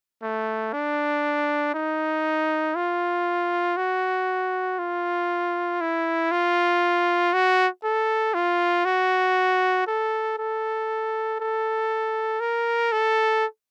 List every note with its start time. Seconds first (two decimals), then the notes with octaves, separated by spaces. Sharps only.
0.22 A3
0.73 D4
1.74 D#4
2.75 F4
3.77 F#4
4.79 F4
5.81 E4
6.31 F4
7.33 F#4
7.84 A4
8.34 F4
8.85 F#4
9.87 A4
10.38 A4
11.40 A4
12.40 A#4
12.92 A4